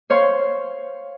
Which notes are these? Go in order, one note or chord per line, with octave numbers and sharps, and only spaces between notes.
C5 C#5 F5 C6